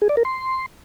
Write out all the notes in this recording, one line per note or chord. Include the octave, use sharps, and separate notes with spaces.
G#4
D5
A#4
C6